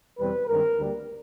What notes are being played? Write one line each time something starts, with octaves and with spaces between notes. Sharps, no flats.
E2 B2 G3 C4 B4
G2 D#3 G#3 C4 A#4
D2 D3 G3 A#3